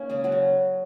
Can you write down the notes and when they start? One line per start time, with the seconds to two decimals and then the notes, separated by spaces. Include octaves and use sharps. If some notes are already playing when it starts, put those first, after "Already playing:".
Already playing: A#3 C#4 D#4
0.10 C#3 G#3 G#4
0.24 F#3 F#4
0.32 C#4